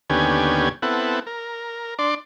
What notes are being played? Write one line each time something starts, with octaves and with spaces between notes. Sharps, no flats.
D#2 D3 B3 C#4 G4 G#5
B3 C4 E4 A4 F#5
A#4
D4 D5 C6